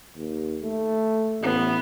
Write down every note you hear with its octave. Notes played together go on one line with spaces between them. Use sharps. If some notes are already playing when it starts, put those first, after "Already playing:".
D#2
A3
A1 B3